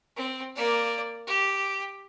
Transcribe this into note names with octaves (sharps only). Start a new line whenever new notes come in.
C4
A#3 D5
G4